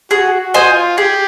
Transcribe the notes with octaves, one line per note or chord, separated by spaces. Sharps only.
F#4 G#4
F#4
C5 D#5 G#5
F4
G4 G#4